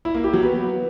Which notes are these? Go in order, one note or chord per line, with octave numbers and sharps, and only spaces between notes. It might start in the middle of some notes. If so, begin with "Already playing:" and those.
E4
A#3
G4
F#3
B3